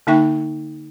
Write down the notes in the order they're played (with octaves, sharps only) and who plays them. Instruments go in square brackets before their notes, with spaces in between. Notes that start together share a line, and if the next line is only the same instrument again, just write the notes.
[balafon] D3 A#3 D#4 E5 G5 C#6